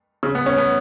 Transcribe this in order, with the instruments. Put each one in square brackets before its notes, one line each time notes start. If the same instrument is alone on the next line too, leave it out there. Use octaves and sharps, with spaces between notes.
[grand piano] C#3
B3
C#4
B3